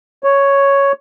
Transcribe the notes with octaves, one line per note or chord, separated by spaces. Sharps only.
C#5